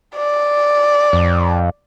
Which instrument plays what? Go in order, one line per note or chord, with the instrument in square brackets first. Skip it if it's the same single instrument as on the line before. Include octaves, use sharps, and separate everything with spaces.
[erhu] D5
[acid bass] F2